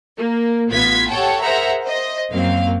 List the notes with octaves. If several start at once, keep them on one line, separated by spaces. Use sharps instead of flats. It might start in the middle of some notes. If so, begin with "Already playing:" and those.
A#3
A1 B3 F4 G#6 B6
G4 A4 C#5 F#5 G5 A5
G#4 A#4 C5 E5 F#5 A#5
C5 D#5
F#2 F#3 A#3 C4 F5